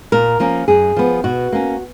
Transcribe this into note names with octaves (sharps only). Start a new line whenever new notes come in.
A#2 A#4
F3 A#3 C#4
F#2 G#4
F3 B3
B2 F#4
A#3 C#4